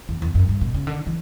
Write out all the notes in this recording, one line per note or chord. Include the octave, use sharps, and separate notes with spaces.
E2
E2
F#2
G2
B2
C#3
D3
E3